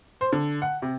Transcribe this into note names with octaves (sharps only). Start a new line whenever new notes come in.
C5
D3
F#5
C3